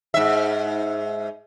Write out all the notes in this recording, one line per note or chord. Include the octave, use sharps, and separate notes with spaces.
G#2 E5